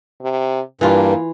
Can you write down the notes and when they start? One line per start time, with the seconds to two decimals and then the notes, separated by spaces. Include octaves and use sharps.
0.21 C3
0.81 G2 E3 A#3 F4